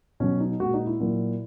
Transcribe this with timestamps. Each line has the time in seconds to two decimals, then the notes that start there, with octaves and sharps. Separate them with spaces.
0.20 B2 F#3 C#4
0.40 D#4
0.60 A#2 G#3 F#4
0.74 D#4
0.87 E4
1.00 A#2 F#3